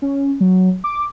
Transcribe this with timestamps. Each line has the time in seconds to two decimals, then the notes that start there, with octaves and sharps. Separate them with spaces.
0.02 C#4
0.41 F#3
0.84 D6